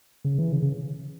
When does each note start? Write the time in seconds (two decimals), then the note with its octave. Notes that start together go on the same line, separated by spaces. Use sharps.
0.25 C#3
0.38 E3
0.52 C#3
0.62 C#3